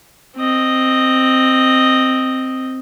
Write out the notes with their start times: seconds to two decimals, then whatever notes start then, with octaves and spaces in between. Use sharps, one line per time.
0.37 C4 D#5